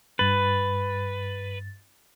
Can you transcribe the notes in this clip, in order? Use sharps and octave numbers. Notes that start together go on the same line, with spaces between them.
G2 B4 A6